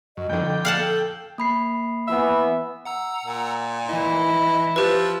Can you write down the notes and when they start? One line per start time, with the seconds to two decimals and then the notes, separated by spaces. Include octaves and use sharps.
0.17 F#2 D#5
0.30 F2 D3 G5
0.65 F5 F#5 A5
0.78 A4
1.38 A#3 B5 C7
2.08 E3 B3 E5
2.85 F#5 A#5 E6
3.25 A#2
3.89 E3 E4 D#5
4.76 F3 G4 B4 E6 F#6 A6